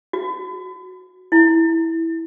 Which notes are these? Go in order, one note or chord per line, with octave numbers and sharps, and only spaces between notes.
F#4
E4